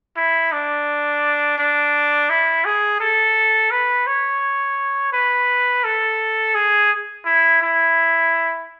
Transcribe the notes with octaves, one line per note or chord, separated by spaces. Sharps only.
E4
D4
D4
E4
G#4
A4
B4
C#5
B4
A4
G#4
E4
E4